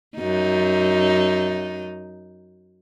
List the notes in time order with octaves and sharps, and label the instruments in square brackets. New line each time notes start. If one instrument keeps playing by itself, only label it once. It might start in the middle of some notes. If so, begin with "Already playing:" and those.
[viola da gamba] F#2 D#4